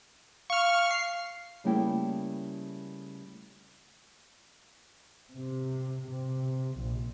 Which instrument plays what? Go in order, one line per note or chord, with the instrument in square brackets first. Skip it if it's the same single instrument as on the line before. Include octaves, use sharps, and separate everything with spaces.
[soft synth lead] F5 [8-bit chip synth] C#6 F6
[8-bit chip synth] C7
[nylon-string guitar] C#3 G3 A3 A#3 E4 G5
[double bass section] C3
C3
A#1